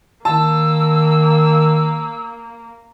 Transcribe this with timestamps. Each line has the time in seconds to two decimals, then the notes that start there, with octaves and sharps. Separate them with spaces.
0.25 D#3 A#3 A5 E6